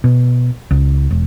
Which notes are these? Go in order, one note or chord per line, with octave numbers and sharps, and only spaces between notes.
B2
C#2
E1